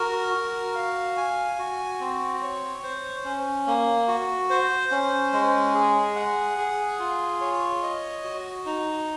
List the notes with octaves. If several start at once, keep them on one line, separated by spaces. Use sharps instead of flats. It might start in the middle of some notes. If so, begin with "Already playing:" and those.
Already playing: F#4 A#4
F#4
F5
G#5
F#4
C4
C#5
C5
C#4
A#3
F#4
C5
C#4
G#3
G#4
F#5
G#4
F4
C#5
D#5
F#4
D#4